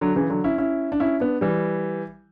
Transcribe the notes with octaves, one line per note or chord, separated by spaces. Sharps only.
D3 F#3
C#3 E3
D3 F#3
C#4 E4
C#4 E4
D4
C#4 E4
B3 D4
E3 G3